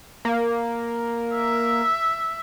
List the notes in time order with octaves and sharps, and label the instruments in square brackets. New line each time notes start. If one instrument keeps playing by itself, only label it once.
[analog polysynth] A#3
[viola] E5